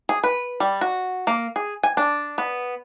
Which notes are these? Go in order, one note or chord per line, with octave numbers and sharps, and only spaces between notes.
G#4
B4
G3
F#4
A#3
G#4
G#5
D4
B3